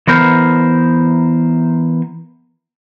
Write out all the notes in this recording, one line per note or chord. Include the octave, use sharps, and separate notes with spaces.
E3 B3 A#4 C5